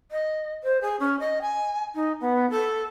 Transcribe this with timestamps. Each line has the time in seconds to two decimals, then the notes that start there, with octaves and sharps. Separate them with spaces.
0.11 D#5
0.63 C5
0.81 G#4
1.00 C#4
1.20 D#5
1.42 G#5
1.95 D#4
2.21 B3
2.50 A4